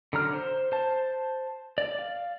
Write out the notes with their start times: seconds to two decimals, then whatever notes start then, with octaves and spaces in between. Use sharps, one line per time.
0.13 D3 F#3 A#5 F6
0.33 C5
0.72 C5 A5
1.78 D5
1.99 F5